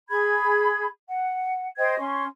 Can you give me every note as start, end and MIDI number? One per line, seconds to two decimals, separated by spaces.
0.09 0.85 68
0.09 0.85 83
0.09 0.85 92
1.08 1.66 78
1.77 1.96 72
1.77 1.96 75
1.77 1.96 79
1.77 1.96 92
1.98 2.24 61
1.98 2.24 84
1.98 2.24 85